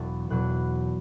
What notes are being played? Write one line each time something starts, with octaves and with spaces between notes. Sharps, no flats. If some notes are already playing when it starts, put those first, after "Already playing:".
Already playing: E1 E2 B2 F#3 A6
E1 E2 B2 F#3 F#6